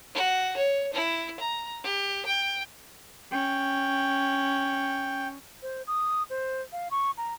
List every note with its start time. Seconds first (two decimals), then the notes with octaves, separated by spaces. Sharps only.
0.14 F#4
0.57 C#5
0.93 E4
1.40 A#5
1.83 G4
2.26 G5
3.32 C#4 G5
5.62 C5
5.87 D#6
6.30 C5
6.72 F5
6.91 C#6
7.17 A#5